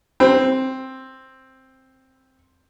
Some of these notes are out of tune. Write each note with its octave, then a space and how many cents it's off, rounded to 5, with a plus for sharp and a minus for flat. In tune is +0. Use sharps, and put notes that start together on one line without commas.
C4 +5